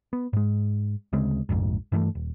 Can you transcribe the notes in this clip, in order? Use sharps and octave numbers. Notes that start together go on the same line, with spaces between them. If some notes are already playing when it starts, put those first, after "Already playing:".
B3
G#2 G#3
D2 C#3 G#3 C4
F1 A#1 F2 G#2
G2 E3 G#3 A3
D#1